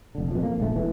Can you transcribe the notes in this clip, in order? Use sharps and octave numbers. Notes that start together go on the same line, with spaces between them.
F1 D3
F2 B2
A#3
E1 A#1 A3
E1 E2 E3